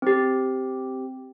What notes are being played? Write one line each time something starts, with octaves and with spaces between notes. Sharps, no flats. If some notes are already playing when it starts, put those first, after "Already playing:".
C4 G4